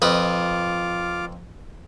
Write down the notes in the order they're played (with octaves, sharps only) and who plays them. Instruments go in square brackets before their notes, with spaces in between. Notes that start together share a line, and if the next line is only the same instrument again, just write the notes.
[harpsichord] F2 B4 D#5 [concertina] F4 D6 F6